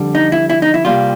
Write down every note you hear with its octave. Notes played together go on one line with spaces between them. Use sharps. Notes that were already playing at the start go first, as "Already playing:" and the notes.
Already playing: F2 D3 G3
D#4
E4
E4
D#4
E4
C2 A#2 G3 F4